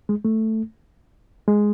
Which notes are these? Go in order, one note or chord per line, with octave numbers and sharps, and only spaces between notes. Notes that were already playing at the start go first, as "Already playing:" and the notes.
G#3
A3
G#3